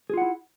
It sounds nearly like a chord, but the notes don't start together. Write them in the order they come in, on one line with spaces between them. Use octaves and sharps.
G#4 F4 F#5 E4